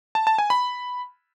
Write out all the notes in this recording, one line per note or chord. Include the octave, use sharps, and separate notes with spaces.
A5
A5
G#5
B5